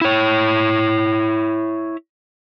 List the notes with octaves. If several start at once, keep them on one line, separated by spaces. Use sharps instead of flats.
E4 C#5